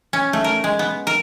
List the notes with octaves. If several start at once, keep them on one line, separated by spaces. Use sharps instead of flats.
C#4
A3
A#4
G#3
B3
A#4